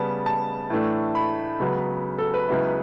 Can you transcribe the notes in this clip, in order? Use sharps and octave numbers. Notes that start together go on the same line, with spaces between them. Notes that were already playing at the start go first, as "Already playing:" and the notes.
Already playing: C#3 G3 B3 A5
A5
A2 E3 A3 D4
B5
C#2 C#3 F#3 B3
A4
B4
C#2 C#3 F#3 B3 E4